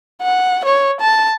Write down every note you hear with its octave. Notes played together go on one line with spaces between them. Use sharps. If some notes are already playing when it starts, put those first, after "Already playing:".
F#5
C#5
A5